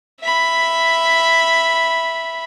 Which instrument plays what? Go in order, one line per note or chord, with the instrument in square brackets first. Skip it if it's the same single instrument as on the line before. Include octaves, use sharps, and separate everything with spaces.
[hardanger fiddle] E5 B5